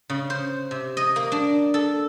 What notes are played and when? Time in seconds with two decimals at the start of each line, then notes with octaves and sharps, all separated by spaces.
0.10 C#3
0.30 C5
0.71 C3
0.97 D#5
1.16 A#3
1.32 D4
1.74 A4